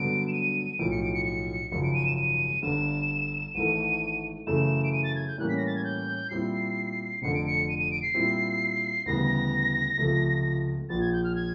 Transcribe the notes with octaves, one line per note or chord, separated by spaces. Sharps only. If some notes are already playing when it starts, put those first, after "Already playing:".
Already playing: G2 D3 F#3 B3 D7
E7
D#7
B1 A2 F3 D7
C#7
D7
C#7
C#7
G#1 F#2 C#3 F3 C#7
D7
D#7
E7
D#7
G1 G2 D3 E7
G#1 G#2 E3 A3 D#7
F#2 C#3 E3 A3 E7
D7
D#7
A6
G#6
G6
A2 E3 G3 A#3 C#4 F#6
B6
A#6
A6
G#6
G6
A#2 G3 C4 E4 C7
F1 F2 D3 C#7
D7
C#7
D#7
D#7
D7
C7
A#2 G3 C4 E4
D2 C#3 E3 G3 B3 A#6
C#2 C3 F3 A3
A#1 A#2 F3 A6
G#6
G6
F6
G#6